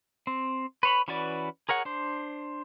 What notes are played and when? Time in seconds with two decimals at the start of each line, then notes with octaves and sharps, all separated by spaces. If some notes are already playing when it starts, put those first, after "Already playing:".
0.27 C4
0.83 B4 C#5 B5
1.08 E3 C#4 F#4 B4 D5
1.69 G#4 A#4 C#5 F#5
1.85 D4 C5